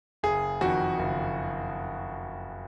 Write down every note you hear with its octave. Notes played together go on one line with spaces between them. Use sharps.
F#1 G#4
F2 D#3 F#4
F#1